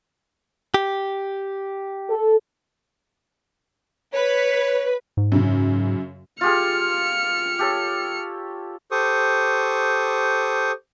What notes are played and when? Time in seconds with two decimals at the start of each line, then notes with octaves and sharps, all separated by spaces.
0.74 G4
2.10 A4
4.14 B4 C#5
5.17 G#2
5.32 F#2 C#3
6.41 F4 G4 G#4 F6 C#7
7.59 G4 A4 C#5
8.91 G4 A4 C5 C#6 D#6